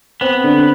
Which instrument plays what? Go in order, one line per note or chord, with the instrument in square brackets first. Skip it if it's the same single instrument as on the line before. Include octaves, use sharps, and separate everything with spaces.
[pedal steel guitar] B3 [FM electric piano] C4
[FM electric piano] D3